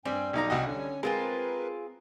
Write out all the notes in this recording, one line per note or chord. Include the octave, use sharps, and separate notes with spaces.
G2 G3 C4 G5 G#5
B1 D#4 D5 A#5
C2 F#4 D#5 E5 G5 G#5
D3 C#4 C#5 G#5
G#3 C4 F4 G#4 A#4 B4